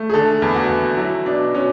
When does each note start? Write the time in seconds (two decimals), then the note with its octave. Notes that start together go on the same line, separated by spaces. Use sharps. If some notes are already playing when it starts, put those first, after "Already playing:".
Already playing: A3
0.10 G#4
0.14 D3 A4
0.42 E2
0.55 F#4
0.69 E2
0.97 F#3 E4
1.26 B2 D4
1.54 B2 C#4